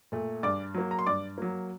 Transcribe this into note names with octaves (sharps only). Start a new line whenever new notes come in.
A#2 A3
G2 D5 D6
F#3 A#3
A#5
C6
G2 D5 D6
F#3 A#3